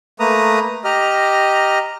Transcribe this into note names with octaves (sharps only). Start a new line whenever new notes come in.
A3 A#3 B4 A#5 D#6
G4 D#5 A#5 F6